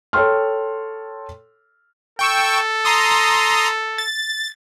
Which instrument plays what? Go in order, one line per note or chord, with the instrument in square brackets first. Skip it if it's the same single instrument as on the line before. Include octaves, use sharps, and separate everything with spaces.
[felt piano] A4 C#5 G5 C6 F6
[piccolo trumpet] A4 [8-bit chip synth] G5 C#6 E6
[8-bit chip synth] A#5 C6 D#6
A6